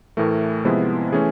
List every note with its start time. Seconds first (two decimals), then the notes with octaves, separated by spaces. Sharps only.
0.17 A2 E3 A3 A#4
0.65 C3 F3 G#3 B3 E4
1.12 E3 A3 C#4 G#4